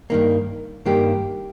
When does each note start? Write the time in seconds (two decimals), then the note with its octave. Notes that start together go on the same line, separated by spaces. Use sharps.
0.10 G2 D#3 A#3
0.86 G2 D#3 A#3 G4